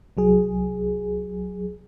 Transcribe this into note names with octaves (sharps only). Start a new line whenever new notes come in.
C2 F#3 G#4